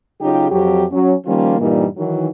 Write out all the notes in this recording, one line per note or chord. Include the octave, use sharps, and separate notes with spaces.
C#3 F#3 D#4 F4 G4
F2 F#3 G4
F#3 C#4
D#3 F3 G3 A#3 C#4 F4
G2 A#2 E3 G3 A#3 D#4
D#3 E3 F#3